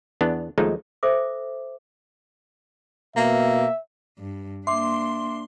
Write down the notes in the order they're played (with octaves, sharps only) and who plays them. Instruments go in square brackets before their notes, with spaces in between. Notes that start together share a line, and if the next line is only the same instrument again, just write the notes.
[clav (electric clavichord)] E2 B3 D4
D#2 F3 G#3 A3 D#4
[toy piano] A4 C5 E5 D6
[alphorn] B2 [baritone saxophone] A#3 [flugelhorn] E5
[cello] G2
[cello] A#3 D4 [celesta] E5 D6 [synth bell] C6